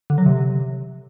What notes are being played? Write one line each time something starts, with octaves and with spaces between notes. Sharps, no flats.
D3
F#3
C3